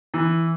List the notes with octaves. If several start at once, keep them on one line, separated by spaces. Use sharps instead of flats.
E3